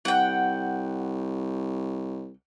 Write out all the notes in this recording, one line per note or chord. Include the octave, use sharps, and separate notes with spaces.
C2 F#5 G5